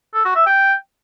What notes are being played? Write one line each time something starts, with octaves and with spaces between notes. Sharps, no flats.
A4
F#4
E5
G5